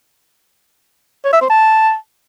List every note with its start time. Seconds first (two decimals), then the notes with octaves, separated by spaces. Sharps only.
1.25 C#5
1.33 E5
1.41 C5
1.50 A5